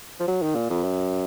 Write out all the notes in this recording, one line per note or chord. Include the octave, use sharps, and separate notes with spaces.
F3
F#3
D#3
A#2
F2
F#2